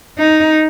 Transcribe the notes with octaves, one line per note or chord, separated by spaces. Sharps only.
D#4